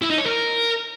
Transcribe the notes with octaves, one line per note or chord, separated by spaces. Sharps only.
E4
D#4
C#5
A#4